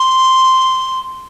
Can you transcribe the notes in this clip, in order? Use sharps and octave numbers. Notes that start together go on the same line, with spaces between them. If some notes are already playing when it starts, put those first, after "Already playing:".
Already playing: C6